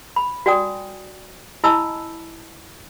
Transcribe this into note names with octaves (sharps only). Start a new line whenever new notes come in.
B5
F#4 D5 G5 G#5 D#6
E4 D#5 G#5 A5 B5 E6